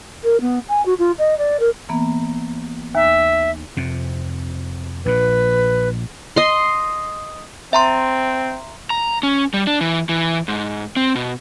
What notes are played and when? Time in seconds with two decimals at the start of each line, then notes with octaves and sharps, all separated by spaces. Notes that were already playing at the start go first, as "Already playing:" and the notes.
0.23 A#4
0.41 B3
0.68 G#5
0.85 F#4
0.98 F4
1.18 D#5
1.38 D5
1.59 A#4
1.89 E3 A#3 B3
2.95 D#2 E5
3.77 F2 C3
5.06 A#1 A#2 B4
6.36 D#5 C6
7.73 C4 E5 A#5 C6
8.90 A#5
9.23 C#4
9.54 G3
9.67 D4
9.81 E3
10.09 E3
10.48 G#2
10.96 C4
11.15 B2